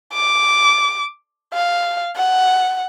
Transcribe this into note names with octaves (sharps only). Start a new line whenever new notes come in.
D6
F5
F#5